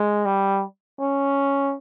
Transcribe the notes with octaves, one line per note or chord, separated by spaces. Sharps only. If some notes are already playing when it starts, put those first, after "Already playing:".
Already playing: G#3
G3
C#4